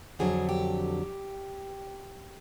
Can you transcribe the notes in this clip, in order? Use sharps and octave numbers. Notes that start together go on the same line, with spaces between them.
F2 D3 F#3 G#4
G4